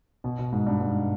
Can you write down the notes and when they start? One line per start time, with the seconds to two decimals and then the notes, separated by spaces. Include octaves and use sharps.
0.24 B2
0.39 B2
0.52 G#2
0.67 G2
0.81 G#2